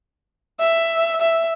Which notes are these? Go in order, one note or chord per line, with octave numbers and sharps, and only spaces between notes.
E5
E5